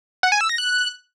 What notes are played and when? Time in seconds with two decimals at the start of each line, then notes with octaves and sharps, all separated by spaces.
0.23 F#5
0.32 G#5
0.41 E6
0.49 A#6
0.58 F#6